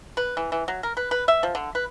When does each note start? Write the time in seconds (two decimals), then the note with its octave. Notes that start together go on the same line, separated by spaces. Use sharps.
0.17 B4
0.37 E3
0.52 E3
0.68 F#3
0.83 A#4
0.97 B4
1.11 B4
1.28 E5
1.43 F3
1.55 D3
1.75 B4